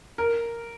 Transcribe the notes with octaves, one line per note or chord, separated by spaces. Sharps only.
A#4